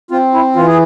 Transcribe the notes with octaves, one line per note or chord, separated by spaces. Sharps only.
C4 F4
E4
E3 F4
G#4